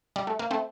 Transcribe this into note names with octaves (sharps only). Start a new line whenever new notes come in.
G3
A3
A#3
A3 C4